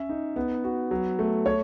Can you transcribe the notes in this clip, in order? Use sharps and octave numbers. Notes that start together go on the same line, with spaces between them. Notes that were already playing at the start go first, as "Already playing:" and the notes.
Already playing: C#4 E5
D#4
B3
F#4
F#3
A3
C#5